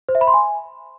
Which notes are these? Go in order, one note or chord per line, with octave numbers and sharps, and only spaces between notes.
C5
E5
B5
C6
G#5